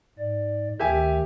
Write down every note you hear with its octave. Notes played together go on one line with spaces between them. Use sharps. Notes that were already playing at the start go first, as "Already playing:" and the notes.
G#2 D5
D2 D#3 G4 E5 G#5